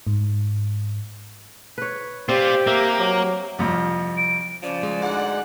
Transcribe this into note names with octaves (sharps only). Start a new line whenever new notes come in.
G#2
B4 C#5
C4 F4 G4 D5
A#3 E5
F#3
C2 F2
D7
C#3 F3 D5
G#3
D2 G#2 F#5